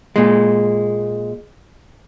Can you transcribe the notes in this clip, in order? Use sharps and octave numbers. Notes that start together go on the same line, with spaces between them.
A#2 G#3